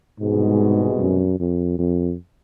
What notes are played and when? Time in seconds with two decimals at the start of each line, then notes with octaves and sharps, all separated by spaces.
0.20 C2 G#2 B2 G#3
0.99 F#2
1.40 F2
1.79 F2